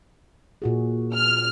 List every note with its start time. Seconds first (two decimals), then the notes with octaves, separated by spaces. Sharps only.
0.62 A#2 F#4 G#4
1.14 F6